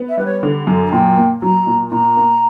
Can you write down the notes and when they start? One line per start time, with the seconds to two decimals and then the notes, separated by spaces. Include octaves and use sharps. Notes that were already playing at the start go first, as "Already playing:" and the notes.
Already playing: B3
0.09 E5
0.17 G3 B4
0.26 C#5
0.43 D3
0.67 F#2
0.87 A#5
0.92 A#2 G5
1.17 A#3
1.41 F#3 A#5
1.67 A#2
1.91 A#2 A#5
2.17 A#3